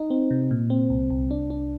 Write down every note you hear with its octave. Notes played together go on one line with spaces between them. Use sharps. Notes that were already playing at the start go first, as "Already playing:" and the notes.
Already playing: D#4
C4
C3
A#2
C4
C2
C2
D4
D4